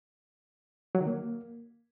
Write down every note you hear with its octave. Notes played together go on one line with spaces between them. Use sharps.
F#3
D#3
A#3